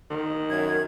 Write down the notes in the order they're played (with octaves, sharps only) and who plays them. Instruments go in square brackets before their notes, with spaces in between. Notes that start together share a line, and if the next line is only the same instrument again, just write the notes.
[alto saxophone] D#3
[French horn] F#2 [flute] G#6